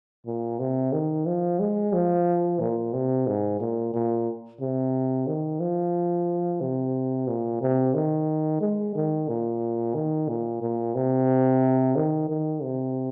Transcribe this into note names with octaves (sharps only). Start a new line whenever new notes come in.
A#2
C3
D#3
F3
G#3
F3
A#2
C3
G#2
A#2
A#2
C3
D#3
F3
C3
A#2
C3
D#3
G#3
D#3
A#2
D#3
A#2
A#2
C3
D#3
D#3
C3